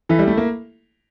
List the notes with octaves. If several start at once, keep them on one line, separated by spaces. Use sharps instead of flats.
E3 E4 A4 E5
G3
A3
A#3